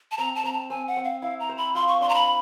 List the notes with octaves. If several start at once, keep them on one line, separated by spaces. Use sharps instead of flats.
A5
C4 A#5
A5
C4 A#5
A5
C4 G#5
F#5
C4
F5
E4 F5
A#5
C5
B5
F4 C6
C#6
D4 C6
A#5
B5